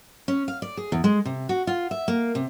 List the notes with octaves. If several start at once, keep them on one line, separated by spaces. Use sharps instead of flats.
C#4
F5
D5
G#4
E2
G#3
C3
F#4
F4
E5
A#3
C3